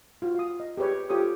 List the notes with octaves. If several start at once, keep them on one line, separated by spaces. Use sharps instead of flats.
F4 F#4
F5 D#6
D#5
G4 G#4 B4 C#5
F4 G4 A4 C#5 D#6